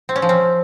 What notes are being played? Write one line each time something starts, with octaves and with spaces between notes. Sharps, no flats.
C4
C#4
F3
C4